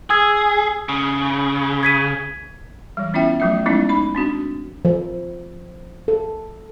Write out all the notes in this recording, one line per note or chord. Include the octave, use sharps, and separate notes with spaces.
G#4 D#6 E6 G#6
C#3
G#6 B6 D#7
E3 G3
B3 C#4 E4 F4 E5 G5
F3 F#3 A3 F4 E5
F3 G#3 B3 C#4 D#4 E4
D#4 B5
C4 D4 F#4
F3
A4